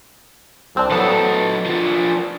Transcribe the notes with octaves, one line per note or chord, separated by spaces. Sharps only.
C2 C4 D4
A2 F#3 B3 A4 A5
F3 D4